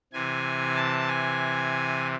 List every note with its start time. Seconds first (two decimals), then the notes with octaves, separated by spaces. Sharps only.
0.13 C3 E3 G#5
0.76 A5
1.08 G#5